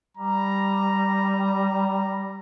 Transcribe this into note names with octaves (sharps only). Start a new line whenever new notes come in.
G3 A#5